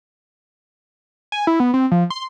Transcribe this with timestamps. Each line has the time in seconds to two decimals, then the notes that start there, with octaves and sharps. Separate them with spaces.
1.32 G#5
1.47 E4
1.60 B3
1.74 C4
1.91 F3
2.10 C6